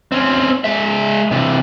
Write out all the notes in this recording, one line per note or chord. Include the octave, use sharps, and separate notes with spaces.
C4 C#4
G#3 E5
C3 E3